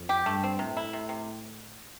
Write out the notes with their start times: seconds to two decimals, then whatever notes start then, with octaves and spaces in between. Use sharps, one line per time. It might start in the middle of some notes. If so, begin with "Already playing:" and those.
Already playing: F2
0.09 G4
0.26 G2 A3
0.44 C4
0.59 A2 C3
0.77 E4
0.93 C3
1.09 C3